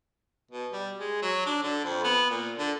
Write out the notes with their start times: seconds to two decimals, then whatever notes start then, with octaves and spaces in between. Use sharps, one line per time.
0.51 B2
0.72 G3
1.00 G#3
1.22 F#3
1.46 D4
1.63 D3
1.84 F2
2.04 B3
2.30 A#2
2.58 D3